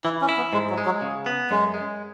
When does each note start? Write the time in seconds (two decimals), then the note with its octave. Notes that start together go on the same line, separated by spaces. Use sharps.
0.04 E3 E4
0.21 C#4
0.29 E4
0.37 B3
0.53 G#2 G#3
0.70 F#3
0.78 G#3
0.85 F#3
1.02 C#3
1.26 B3
1.50 F#2 G#3
1.74 G#3